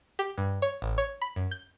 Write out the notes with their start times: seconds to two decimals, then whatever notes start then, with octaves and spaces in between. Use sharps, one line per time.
0.19 G4
0.38 G2
0.62 C#5
0.82 A1
0.98 C#5
1.22 B5
1.36 F#2
1.51 G6